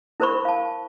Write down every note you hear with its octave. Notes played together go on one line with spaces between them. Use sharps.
E4 A#4 C5 B5 C#6
F5 A5